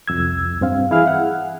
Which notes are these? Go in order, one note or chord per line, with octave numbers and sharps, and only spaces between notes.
C2 F2 E6 G#6
G2 C4 F5
E3 E4 G#4 F5 F6
F#5